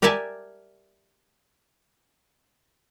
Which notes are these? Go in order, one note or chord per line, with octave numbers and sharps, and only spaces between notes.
G4 A#4 D5 E5 G#5 A5